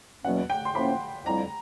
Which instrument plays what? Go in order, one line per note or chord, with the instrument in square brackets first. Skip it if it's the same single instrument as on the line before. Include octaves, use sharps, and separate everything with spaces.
[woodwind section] E2 B2 F#3 A#3 C#4 [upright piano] F#5
[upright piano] G5
C6
[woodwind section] A2 F3 A#3 C#4 [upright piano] B5
[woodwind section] F2 D3 G3 C4 E4 [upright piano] A#5